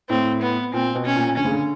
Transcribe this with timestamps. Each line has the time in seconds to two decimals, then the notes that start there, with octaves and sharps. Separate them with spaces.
0.09 A2 C4
0.41 B3
0.73 A#2 C4
0.95 B2
1.06 C#4
1.16 A#2
1.37 D3 C#4
1.45 C#3
1.52 D3